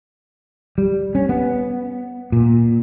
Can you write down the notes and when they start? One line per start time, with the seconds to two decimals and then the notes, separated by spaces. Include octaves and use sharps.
0.78 G3
1.15 C#4
1.29 B3
2.32 A#2